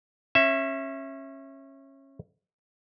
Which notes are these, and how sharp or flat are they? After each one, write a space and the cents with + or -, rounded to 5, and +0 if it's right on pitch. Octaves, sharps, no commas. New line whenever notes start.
C#4 -25 E5 +5